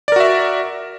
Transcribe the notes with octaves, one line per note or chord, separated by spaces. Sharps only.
F#4 A#4 D5 E5